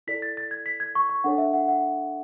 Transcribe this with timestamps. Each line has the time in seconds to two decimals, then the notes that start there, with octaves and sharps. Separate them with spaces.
0.07 E4 A4 D5 B6
0.22 A6
0.37 A6
0.51 G#6
0.66 B6
0.80 G#6
0.95 C#6
1.10 C#6
1.24 D4 A4 C#5 F#5
1.38 E5
1.53 F#5
1.68 F#5